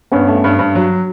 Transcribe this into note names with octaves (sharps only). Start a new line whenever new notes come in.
G2 B3 C#4
A3
G2
G2
F#3